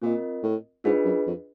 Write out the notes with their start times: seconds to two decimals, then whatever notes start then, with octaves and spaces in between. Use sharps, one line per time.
0.02 A#2 C4 F4 A#4 D#5
0.43 A2
0.84 G#2 D4 F4 G#4 B4 D#5
1.05 F#2
1.27 F2